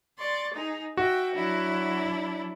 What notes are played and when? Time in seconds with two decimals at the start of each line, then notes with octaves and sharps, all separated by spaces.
0.18 D5 C6 C#6
0.53 D#4 G#4
0.97 F#4 E5 G5
1.33 F#3 D4 E4